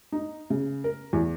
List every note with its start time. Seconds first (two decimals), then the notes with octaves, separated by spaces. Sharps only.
0.12 D#4
0.50 C#3
0.84 A#4
1.13 E2